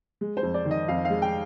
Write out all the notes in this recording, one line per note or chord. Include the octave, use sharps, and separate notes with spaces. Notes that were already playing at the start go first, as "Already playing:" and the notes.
G#3
C5
F2
D5
D#3
D#5
F2 F5
F5
G#3
G5